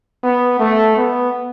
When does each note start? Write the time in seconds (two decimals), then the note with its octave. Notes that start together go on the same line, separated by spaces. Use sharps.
0.23 B3
0.60 A3
0.97 B3